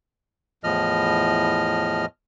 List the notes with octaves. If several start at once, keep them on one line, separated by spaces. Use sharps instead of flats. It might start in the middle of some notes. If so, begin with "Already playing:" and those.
E2 A2 F3 D#5 F6